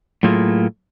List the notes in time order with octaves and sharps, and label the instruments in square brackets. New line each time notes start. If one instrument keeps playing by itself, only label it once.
[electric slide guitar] A2 F#3 A3 A#3 F4 G#4